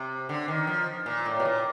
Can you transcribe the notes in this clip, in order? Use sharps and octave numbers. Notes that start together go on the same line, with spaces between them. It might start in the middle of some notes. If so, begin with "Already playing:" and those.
Already playing: C3
D3
D#3
F3
A#2
A2
B2
A#2